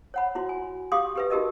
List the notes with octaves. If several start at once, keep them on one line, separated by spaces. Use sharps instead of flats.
C#5 F#5 B5
E4 F#4 C6
G#5
G4 F5 C6 D6 D#6
G4 B4 E5
D#4 F#4 G4 A#4 D#5